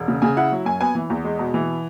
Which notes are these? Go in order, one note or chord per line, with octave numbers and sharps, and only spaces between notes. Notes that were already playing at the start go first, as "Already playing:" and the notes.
Already playing: E1
C#3
C#3 G#5
E4 F#5
F#3
F#2 G#5
B3 G#5
E3
E2
G#3
B2
E3